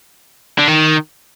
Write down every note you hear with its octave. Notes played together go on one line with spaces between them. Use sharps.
D3
D#3